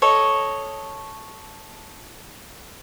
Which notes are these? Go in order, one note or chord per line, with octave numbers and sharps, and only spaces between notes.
A4 C#5 D#5